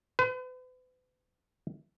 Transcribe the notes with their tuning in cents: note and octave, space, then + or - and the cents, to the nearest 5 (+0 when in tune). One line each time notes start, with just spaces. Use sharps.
B4 +40